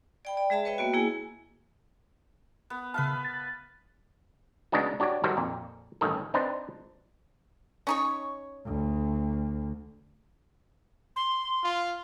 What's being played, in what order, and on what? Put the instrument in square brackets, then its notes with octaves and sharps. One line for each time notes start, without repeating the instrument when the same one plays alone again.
[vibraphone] D5 G5 B5
D5
G#3 G#4 E5 A5 B5
B4 C#5 D#5 E5 G5
A#3 B3 F#4
A#3 E4 G#4 G#5
[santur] B3
[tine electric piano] C#3 A5 [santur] B4 E5 F5
[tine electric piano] A6
[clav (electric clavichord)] C#3 G#3 B3 D4 D#4 F#4
D4 F#4 G4 C#5 D5
D#3 F#3 G3 F#4 A4 C5
F2 A#2
A1 G2 D#3 A4
C4 D4 D#4 B4 C5
[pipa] C#4 D#4 C#5
[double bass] D2
[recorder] C6
[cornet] F4